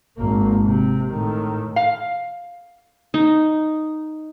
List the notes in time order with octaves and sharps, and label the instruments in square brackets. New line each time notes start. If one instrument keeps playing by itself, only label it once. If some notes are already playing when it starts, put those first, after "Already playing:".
[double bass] G#1 A#3
C3
A2 D#3
[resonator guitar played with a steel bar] F5
[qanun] D#4